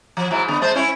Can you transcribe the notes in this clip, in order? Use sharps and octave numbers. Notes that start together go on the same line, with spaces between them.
F3
G#2 F#3 E4
D3 B3
G#3 C5
C#4 E4 C#5